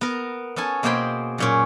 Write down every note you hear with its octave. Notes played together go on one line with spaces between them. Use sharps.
B3 A#4
B3 C#4 A4 G#5
B2 A#3 G#4 C5 G5 B5
F#2 A#2 C#4